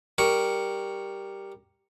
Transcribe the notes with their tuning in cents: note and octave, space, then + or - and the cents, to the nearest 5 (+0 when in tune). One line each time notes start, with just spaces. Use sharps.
G3 +0 A#4 +0 C#6 +0